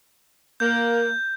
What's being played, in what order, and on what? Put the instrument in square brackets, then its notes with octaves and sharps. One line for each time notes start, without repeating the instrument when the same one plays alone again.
[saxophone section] A#3 [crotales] G6